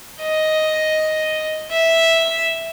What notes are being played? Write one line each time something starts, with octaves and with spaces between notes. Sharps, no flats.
D#5
E5